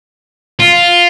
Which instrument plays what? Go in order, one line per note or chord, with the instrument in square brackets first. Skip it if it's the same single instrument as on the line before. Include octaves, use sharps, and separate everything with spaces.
[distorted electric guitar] F4